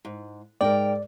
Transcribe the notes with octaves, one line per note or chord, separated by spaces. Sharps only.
G#2
G#2 A#4 D5 G5